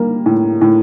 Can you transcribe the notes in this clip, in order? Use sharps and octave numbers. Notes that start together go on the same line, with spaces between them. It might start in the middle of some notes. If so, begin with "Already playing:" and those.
Already playing: G3 A#3
A2
A2